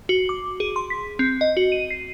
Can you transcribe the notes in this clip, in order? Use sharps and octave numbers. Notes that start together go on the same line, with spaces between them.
F#4
D6
G#4
C6
B6
C4
D#5
F#4
D#7
C7